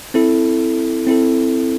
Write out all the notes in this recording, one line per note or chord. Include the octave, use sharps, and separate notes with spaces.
C4 E4 A4
C4 E4 A4